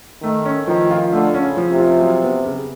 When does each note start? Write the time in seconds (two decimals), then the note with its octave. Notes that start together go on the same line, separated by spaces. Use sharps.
0.23 D#3 A3
0.45 C#4
0.67 D#3 F3
0.90 F4
1.12 D3 A3
1.34 C#4
1.41 C#3
1.57 F3
1.71 C3
1.79 F4
2.01 F#3
2.23 B3
2.46 C#3